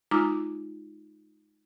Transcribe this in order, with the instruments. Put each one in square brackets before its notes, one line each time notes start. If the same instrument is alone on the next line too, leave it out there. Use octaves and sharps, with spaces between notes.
[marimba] G#3 D#4 F4 A#5 D6 E6